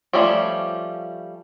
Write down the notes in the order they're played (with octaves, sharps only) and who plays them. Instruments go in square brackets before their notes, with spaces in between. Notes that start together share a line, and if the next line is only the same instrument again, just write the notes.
[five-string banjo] F3 G3 A3 C#4 G4